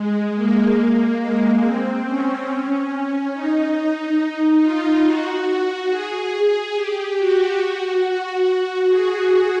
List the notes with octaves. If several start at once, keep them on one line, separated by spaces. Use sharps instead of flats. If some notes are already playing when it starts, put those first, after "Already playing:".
Already playing: G#3
A#3
G#3
C4
C#4
D#4
D#4
F4
F#4
G#4
G4
F#4
G#4